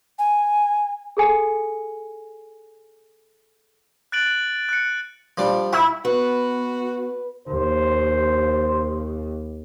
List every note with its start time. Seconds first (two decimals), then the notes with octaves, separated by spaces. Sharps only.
0.19 G#5
1.17 G#4 A4 G#5 C#7
4.12 F#6 A6 D7 F#7
4.69 F#6 C#7
5.37 F3 G3 D4
5.73 E4 E5
6.05 B3 F#4 B4
7.47 D#2 C5